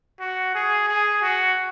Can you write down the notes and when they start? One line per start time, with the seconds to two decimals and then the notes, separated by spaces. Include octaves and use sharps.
0.20 F#4
0.55 G#4
0.88 G#4
1.22 F#4